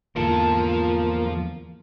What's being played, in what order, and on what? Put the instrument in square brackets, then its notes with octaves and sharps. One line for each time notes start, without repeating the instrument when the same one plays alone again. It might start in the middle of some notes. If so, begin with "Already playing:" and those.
[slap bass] E2 G#2 D3 [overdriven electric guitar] F3 A5 [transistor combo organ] A#3 F4